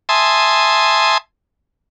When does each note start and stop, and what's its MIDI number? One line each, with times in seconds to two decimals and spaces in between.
0.09 1.18 76
0.09 1.18 80
0.09 1.18 81
0.09 1.18 84
0.09 1.18 87